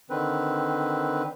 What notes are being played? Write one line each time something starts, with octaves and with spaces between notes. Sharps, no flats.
D3 D#3 C4 B4